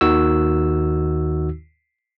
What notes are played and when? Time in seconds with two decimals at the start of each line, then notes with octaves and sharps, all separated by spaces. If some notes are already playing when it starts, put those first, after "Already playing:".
0.01 D#2 D#3 D#4 F#4 E6